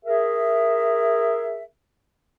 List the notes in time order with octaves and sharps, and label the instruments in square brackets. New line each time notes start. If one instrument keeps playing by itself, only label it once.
[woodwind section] G#4 A#4 E5